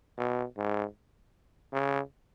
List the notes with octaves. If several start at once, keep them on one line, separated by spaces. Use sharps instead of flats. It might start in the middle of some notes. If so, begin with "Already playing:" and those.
B2
G#2
C#3